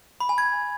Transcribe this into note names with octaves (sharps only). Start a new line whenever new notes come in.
B5
G#5
G#6